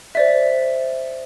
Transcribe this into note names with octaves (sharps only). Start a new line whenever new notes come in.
C5 D5 E5